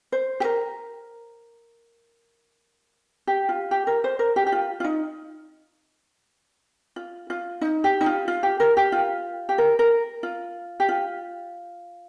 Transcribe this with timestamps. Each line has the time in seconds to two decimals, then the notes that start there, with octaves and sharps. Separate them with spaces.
0.12 C5
0.40 G4
0.44 A#4
3.27 G4
3.49 F4
3.71 G4
3.87 A#4
4.04 C5
4.19 A#4
4.36 G4
4.47 G4
4.52 F4
4.80 F4
4.84 D#4
6.96 F4
7.30 F4
7.61 D#4
7.84 G4
8.01 D#4
8.06 F4
8.28 F4
8.43 G4
8.60 A#4
8.77 G4
8.92 F4
9.49 G4
9.58 A#4
9.79 A#4
10.23 F4
10.80 G4
10.89 F4